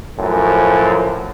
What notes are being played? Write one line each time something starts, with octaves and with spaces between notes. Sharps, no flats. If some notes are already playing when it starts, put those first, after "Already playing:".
F#2 A2 F3